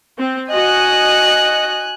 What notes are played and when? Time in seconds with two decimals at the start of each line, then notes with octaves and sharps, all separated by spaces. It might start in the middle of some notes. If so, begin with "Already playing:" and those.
0.18 C4
0.52 F#4 D#5 G#5 F#6